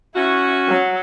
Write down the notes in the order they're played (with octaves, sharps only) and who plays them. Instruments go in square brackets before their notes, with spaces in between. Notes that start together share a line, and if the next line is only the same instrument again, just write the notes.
[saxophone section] C#4 F#4 [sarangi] E4
[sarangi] F#3